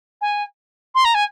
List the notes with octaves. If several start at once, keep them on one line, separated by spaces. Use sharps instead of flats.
G#5
C6
A#5
G#5